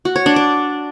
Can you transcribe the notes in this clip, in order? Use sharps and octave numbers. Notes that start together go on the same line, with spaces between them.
F#4
C#5
D4
D5